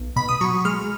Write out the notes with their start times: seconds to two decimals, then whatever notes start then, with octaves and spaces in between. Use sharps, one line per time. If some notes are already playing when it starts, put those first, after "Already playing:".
Already playing: B1
0.16 B2 B5
0.29 D#6
0.41 F#3 C#6
0.65 G#3 F6